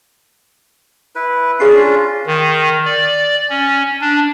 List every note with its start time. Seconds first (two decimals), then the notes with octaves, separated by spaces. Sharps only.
1.15 E4 B4
1.60 C#4 D4 F4 G#4 C7
2.27 D#3
2.85 D5
3.50 C#4
4.01 D4